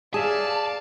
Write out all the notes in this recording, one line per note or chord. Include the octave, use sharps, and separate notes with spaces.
G#4 D5 E5 F5 A5